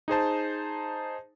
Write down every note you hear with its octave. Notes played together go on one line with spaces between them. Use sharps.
D#4 G#4 C5 A5